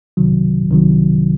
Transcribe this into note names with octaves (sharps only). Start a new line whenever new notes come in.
C2 C3 D#3 F#3
C2 C3 D#3 F#3